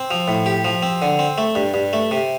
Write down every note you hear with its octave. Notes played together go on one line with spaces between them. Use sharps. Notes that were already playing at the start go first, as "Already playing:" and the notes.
Already playing: C4
F3
A2
G4
F3
C4
D3
C4
A3
G2
G2
A3
C3